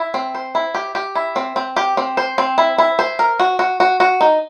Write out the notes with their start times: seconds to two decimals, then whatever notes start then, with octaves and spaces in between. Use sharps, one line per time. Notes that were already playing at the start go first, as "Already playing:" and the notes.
Already playing: E4
0.14 C4
0.35 C5
0.55 E4
0.75 G4
0.95 G4
1.15 E4
1.36 C4
1.56 C4
1.76 G4
1.97 C4
2.17 C5
2.38 C4
2.58 E4
2.78 E4
2.99 C5
3.19 A#4
3.40 F#4
3.59 F#4
3.80 F#4
4.00 F#4
4.21 D#4